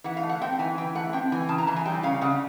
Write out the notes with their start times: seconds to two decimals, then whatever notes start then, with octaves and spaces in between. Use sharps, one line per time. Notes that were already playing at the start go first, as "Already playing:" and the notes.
0.04 E3 F#5
0.17 F5
0.23 A3
0.29 F#5
0.42 C4 G5
0.59 E3 G#5
0.78 E3 G5
0.95 A3 F#5
1.13 C4 G5
1.32 E3 G#5
1.49 C#3 A5
1.58 A#5
1.67 E3 A5
1.76 G#5
1.85 G3 G5
2.03 C#3 F5
2.21 C#3 F#5